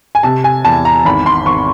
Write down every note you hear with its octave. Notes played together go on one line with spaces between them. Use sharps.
G#5
C3 A5
G#5
E2 A5
A#5
G#1 B5
C6
G#1 C#6